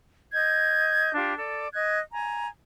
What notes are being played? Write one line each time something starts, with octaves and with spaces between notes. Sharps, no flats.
D#5 G6 G#6
D4 F4 G4
A4 D5
D#5 F#6 G#6
G#5 A#5